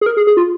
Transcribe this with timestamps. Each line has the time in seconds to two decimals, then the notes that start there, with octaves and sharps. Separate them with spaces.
0.01 G#4
0.06 A#4
0.17 G#4
0.27 G#4
0.37 F4